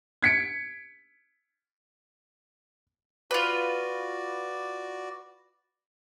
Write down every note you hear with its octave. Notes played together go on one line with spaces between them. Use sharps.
G#6 B6 C#7 D7
F4 F#4 B4 D5